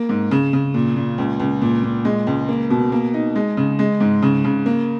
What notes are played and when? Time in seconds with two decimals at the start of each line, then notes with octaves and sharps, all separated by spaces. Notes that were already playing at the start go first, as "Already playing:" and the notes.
Already playing: A#3
0.09 G#2
0.31 C#3
0.53 C#3
0.74 A#2
0.96 A#2
1.18 C#2
1.40 C#2
1.62 A#2
1.83 A#2
2.05 G#3
2.27 C#2
2.49 A#3
2.70 B2
2.92 A#3
3.14 D#4
3.36 G#3
3.57 C#3
3.79 G#3
4.00 G#2
4.22 C#3
4.44 C#3
4.66 A#3